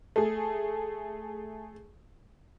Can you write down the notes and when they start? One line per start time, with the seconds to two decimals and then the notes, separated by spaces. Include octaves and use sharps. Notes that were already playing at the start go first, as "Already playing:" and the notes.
0.16 A3 G#4